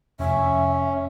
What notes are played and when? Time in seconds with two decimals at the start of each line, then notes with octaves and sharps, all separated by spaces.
0.20 F1 C#4 E5